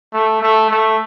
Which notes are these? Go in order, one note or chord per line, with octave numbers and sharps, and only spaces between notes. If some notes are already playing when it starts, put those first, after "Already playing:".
A3
A3
A3